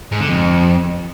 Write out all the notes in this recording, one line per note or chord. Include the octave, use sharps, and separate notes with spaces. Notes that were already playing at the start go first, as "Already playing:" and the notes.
G#2
D3
F2